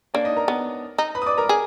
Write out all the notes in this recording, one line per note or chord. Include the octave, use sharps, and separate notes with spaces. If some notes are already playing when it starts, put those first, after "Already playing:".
A#3 D4 D5
D#4 D#5
A#4 A#5
B3
D#4
B4 B5
D#6
D5 D6
A#4 A#5
G#4